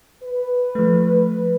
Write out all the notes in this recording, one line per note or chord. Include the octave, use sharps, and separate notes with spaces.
B4
F3 A3